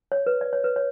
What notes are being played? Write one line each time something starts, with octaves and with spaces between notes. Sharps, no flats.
C#5
B4
D5
C#5
B4
C#5